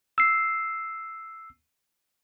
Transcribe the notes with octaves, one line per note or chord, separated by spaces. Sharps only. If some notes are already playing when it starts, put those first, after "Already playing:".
E6 C7